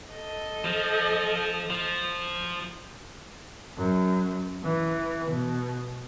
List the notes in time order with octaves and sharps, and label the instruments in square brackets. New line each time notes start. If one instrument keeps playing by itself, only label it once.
[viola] A4 D#5
[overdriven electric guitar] F3
F3
[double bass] F#2
E3
B2